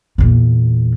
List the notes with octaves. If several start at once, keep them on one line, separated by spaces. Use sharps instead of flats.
E2 A#2